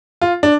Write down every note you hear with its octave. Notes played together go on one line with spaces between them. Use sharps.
F4
D4